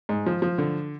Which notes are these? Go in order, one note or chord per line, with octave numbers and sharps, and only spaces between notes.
G#2
F3
F3
D3